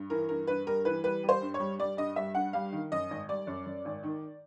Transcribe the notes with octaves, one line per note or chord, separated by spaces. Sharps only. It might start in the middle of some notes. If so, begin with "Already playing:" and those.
Already playing: G2
E3 A#4
G2 A#4
G2 B4
G3 A#4
E3 B4
G3 B4
G3
C5
G2
C#5
G3
G3 D5
G2 D#5
G3 E5
G2 F#5
G3 F5
D#3
F#2 D#5
G#1
G3 D5
F#2
F#2
G#1
D#3